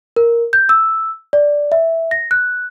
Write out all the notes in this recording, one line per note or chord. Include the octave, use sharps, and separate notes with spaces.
A#4
G6
E6
D5
E5
A#6
F#6